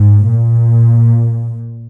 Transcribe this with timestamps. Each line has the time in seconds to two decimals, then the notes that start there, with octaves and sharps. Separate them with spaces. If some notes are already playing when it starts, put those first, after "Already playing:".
Already playing: G#2
0.29 A#2